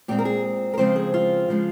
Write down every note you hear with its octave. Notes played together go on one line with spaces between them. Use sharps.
A#2 G#3 C4 G4
A#4
G#4
A#4
C#3 F3 G#3 C4 C5
G#4
F4
C#3 F3 G#3